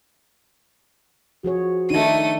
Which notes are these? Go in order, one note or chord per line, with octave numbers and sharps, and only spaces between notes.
F3 F#4 G#4 C#5
D#3 A3 D4 D#4 D#7